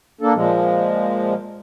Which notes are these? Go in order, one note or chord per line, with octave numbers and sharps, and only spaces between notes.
A#3 D4 A4
A#2 F3 G#3